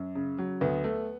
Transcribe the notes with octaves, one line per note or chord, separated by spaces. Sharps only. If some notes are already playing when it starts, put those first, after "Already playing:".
Already playing: F#2
C#3
F#3
D2 B3
A3